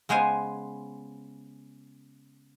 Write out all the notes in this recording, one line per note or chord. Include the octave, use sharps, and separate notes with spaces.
C#3 G#3 B3 C5 G#5